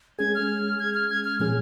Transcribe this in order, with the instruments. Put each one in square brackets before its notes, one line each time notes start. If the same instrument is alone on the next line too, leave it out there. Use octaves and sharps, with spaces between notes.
[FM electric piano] G#3 C#4 G#4 [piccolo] G#6
[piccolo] F6
G#6
F6
G#6
F6
[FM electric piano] A#2 F3 C#4 G#4 [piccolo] F6